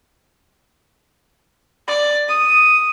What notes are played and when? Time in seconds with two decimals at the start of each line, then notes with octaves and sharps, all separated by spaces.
1.87 D5
2.28 D#6